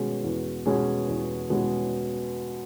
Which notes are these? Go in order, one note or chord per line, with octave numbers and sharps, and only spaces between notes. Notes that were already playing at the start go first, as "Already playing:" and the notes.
Already playing: B2 G#3 C#4 G#4
E2
B2 G#3 C#4 G#4
E2
B2 G#3 C#4 G#4